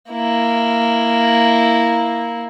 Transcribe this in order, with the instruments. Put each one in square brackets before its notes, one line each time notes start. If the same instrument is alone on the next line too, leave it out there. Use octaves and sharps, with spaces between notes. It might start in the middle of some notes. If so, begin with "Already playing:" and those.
[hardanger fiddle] A#3 E4